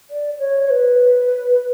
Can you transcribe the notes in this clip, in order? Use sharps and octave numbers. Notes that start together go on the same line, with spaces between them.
D5
C#5
C#5
B4